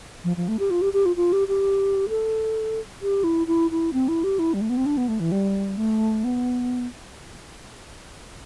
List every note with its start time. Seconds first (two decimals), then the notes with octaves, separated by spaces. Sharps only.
0.24 F3
0.37 F3
0.48 A3
0.59 G4
0.70 F4
0.82 G4
0.93 G4
1.06 F4
1.16 F4
1.33 G4
1.48 G4
2.09 A4
3.02 G4
3.24 E4
3.47 E4
3.71 E4
3.93 C4
4.08 E4
4.24 G4
4.39 E4
4.54 G3
4.61 A3
4.70 B3
4.77 C4
4.86 D4
4.97 B3
5.08 A3
5.20 E3
5.32 G3
5.77 A3
6.24 B3